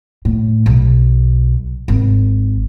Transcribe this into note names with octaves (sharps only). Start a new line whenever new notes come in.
A2
B1
G#1